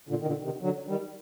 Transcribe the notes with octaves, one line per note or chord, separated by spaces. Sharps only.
A#2 D3
D#3
A#2 D3
C3 D#3
D3 F#3
D#3 G3